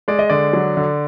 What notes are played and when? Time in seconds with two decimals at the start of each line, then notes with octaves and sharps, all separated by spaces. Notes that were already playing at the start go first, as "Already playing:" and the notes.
0.08 G#3 D5
0.19 D#5
0.30 D3 D5
0.53 F#3
0.77 D3